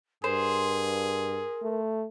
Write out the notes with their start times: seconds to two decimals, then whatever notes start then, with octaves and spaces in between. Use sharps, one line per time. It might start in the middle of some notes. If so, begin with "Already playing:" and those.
0.24 G2 G#4 A#4 C5
1.63 A3